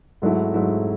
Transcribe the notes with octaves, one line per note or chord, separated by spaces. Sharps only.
G#2 F#3 A3 E4
G#2 F#3 A3 E4